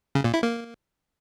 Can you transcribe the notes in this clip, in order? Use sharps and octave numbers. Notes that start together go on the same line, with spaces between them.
C#3
A#2
E4
A#3